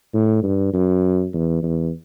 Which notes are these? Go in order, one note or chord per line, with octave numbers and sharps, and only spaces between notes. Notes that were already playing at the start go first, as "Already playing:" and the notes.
A2
G2
F#2
E2
E2